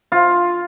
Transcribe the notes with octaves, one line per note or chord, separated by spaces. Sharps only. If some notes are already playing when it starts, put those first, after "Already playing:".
F4